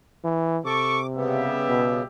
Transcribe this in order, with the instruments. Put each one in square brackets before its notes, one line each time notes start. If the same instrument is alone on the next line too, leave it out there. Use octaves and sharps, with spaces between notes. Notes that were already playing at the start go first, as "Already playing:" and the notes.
[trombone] E3
[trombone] C3 [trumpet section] A4 C#6 [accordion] D6
[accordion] C#3 B3 [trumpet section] G3 G4 E5
[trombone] B2